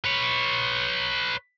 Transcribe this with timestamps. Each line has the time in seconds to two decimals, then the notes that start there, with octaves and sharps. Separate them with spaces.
0.05 B4 C#5